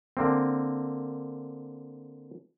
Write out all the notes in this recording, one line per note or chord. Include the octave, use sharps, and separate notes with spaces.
D3 A#3 C4